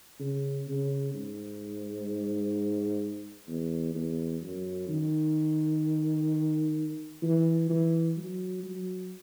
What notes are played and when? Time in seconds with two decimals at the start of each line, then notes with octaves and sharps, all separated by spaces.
0.20 C#3
0.68 C#3
1.14 G#2
3.48 E2
3.95 E2
4.42 F#2
4.88 D#3
7.23 E3
7.70 E3
8.17 F#3
8.63 F#3